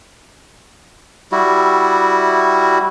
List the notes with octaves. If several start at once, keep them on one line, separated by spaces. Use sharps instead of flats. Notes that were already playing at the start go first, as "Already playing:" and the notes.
G3 E4 F#4